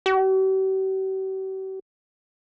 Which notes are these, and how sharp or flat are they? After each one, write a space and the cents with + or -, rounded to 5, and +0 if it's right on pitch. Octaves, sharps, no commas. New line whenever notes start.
G4 -45